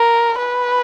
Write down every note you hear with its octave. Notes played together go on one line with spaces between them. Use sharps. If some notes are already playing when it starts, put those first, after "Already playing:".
Already playing: A#4
B4